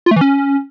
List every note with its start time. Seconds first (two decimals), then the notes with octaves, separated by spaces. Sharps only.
0.06 F4
0.11 A3
0.16 E3
0.21 C#4